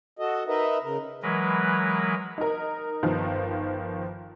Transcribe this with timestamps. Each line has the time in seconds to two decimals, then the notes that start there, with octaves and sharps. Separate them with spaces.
0.19 F#4 A4 D#5
0.48 D#4 A#4 B4 D#5 E5
0.83 C#3 A#4
1.23 E3 F#3 G#3 A#4 B4
2.38 D#4 A#4
3.03 G1 D#3 F3